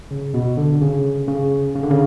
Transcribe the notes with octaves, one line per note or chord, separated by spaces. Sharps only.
C#3
B2
D3
C#3
C#3
C#3
D3
C#3